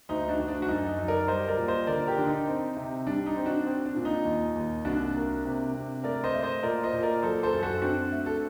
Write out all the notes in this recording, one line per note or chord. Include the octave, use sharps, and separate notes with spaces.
D2 D#4
D4 F#4
D2
D4
F#4
F#2 D#4
D#4
F#3
A#4 D5
G3 C5 D#5
A#4 D5
A#2
C5 D#5
D3 A#4 D5
G4 A#4
D3 D4
D#4
C4
C3
G3 D4
D#4
C4
D4 F#4
C4
D4
A#2
D#4
D#2
D#2
C2 D4 F#4
A#3
C3
C3
A3 A#4 D5
C5 D#5
A3
C5 D#5
A#2 A#4 D5
C5 D#5
A#2
A#4 D5
F#3 A4 C5
A4 C5
F#2
F#4 A4
C4 D4 F#4
A3
A4